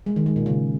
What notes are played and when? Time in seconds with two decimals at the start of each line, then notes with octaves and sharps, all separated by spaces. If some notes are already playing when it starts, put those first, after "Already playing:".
0.06 G#3
0.16 D#3
0.26 G#3
0.36 A#2
0.46 C#3